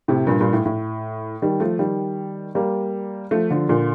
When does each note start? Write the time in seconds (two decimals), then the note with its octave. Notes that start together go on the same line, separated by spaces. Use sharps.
0.08 A2 C3
0.27 G2 A#2
0.40 G2 A#2
0.53 A2
0.65 A2
1.42 D#3 G3
1.60 F3 A3
1.79 D#3 G3
2.55 G3 A#3
3.31 F3 A3
3.50 D3 F3
3.69 A#2 D3